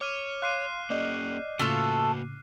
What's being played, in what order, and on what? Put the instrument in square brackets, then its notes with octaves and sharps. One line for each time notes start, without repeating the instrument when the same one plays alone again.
[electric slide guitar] C#5 [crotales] D6 F6 D#7
[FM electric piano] F5 C6 D6 [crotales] F#6 C7 D#7
[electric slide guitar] A#3 C#4 G#4 [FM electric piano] D5 D#5 G6
[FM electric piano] A2 C#3 [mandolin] A3 F4 A4 [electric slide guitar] A#3 F#4